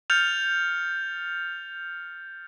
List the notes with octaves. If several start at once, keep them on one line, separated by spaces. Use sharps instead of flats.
F6 G6 A6 C#7 F7